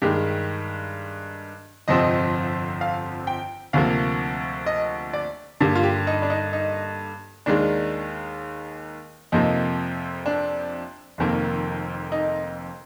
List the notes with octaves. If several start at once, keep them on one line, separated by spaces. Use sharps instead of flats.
G2 D#3 G#3 G4
G1 F2 C3 F3 C4 D#5
F5
G5
D2 C3 F3 A#3 F5
D#5
D5
G2 D3 G3 A#3
F4
G4
D#4
D4
D#4
D#4
D#2 D#3 G#3 D4
F2 C3 F3 A#3 D#4
D4
F1 F2 D#3 A#3
D#4